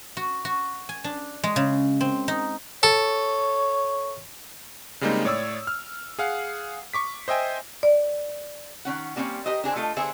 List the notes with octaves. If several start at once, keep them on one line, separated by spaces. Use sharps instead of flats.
F#4
F#4
G#5
D4
G#3
C#3
C4
D#4
A4 C#5
C#3 G3 G#3 A#3 C4 D#4
A2 C#5 D5 D#6 E6
F6
G#4 F5 F#5
C#6 D6 B6
C5 D#5 E5 G5 G#5
D5
D#3 C#4 F#5
G3 A#3 C4 C#4
G4 A#4 C5 D#5
D4 G#4 A#4 C5
A3 F4 A4 D#5
D3 B3 G#4 C5 E5